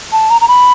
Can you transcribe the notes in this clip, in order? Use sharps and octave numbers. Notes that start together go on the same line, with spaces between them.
A5
A#5
A#5
B5